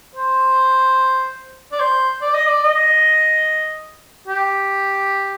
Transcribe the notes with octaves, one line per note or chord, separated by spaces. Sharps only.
C5
D5
C5
D5
D#5
D5
D#5
G4